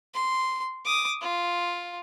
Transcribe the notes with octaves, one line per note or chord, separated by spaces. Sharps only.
C6
D6 D#6
F4